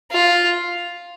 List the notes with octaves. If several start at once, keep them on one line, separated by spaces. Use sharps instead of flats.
F4